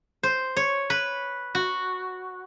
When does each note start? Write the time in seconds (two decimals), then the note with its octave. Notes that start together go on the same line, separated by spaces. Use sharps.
0.23 C5
0.56 C#5
0.90 B4
1.55 F#4